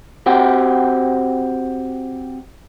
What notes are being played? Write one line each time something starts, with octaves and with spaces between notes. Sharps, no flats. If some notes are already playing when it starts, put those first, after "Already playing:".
C4 F#4 G4